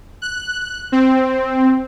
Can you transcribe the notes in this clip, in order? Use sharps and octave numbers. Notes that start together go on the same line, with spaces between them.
F#6
C4